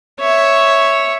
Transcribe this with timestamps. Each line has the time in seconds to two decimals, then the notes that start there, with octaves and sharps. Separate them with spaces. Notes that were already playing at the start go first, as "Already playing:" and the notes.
0.20 C#5 E5